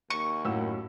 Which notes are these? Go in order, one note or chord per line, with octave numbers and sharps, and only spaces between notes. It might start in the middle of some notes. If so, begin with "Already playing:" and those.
D#2 C#6
F#2 A2 C#4 E6